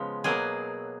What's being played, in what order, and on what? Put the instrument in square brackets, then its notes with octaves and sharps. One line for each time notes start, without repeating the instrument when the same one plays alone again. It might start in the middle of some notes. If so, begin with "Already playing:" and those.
Already playing: [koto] C#3 F3 G#3 B3
B2 F#3 A#3 G#4